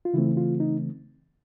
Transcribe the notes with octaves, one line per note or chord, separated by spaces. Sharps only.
F4
C#3 E3 A3 C4 E4
F4
D#4